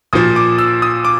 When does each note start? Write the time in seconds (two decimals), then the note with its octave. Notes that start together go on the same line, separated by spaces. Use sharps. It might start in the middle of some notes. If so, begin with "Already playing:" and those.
0.13 A#2 F3 D#6
0.36 D6
0.58 E6
0.82 D#6
1.05 D6